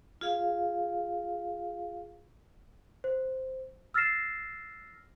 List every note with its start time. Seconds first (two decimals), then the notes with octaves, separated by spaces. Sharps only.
0.21 F4 G#4 F5
3.04 C5
3.94 E6 F6 A6 A#6 C7 E7